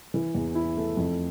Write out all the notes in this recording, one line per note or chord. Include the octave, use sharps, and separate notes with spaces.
E3
E2
E4
A3
F2